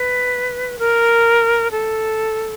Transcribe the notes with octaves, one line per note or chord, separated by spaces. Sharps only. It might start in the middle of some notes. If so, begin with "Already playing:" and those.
Already playing: B4
A#4
A4